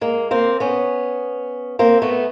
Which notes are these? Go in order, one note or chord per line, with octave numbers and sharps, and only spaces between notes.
G#3 A#3
A#3 C4
B3 C#4
A#3 C4
A3 B3